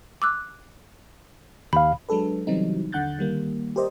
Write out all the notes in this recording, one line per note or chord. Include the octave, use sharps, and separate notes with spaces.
D6 E6 F#6
D#2 F5 B5
F#3 G#3 D4 A4 B4
C#3 E3 F#3 G3 C4 D#4
D#2 D3 F#5 F#6 G6 A6
D#3 G3 A#3
G4 A#4 C5 D5 D#5